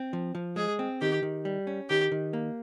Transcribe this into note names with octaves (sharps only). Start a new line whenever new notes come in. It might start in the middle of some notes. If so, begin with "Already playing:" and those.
Already playing: C4
F3
F3
G#3 G#4
C4
D#3 G4
D#3
G3
C#4
D#3 G4
D#3
A#3